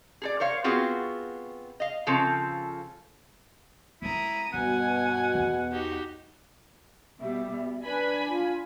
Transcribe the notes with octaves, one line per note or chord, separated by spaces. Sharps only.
G#4 A4 D5
A#4 C5 C#5 F5
B3 C4 F4 F#4 G#4
D#5 F5
C#3 F3 C4 A4
G#3 C4 E4 A#5 D#6
G2 B2 F#5 G#5
E2
D#4 F#4 G4
B2 G3 E5
B2
D4 B4 G#5 B5
F4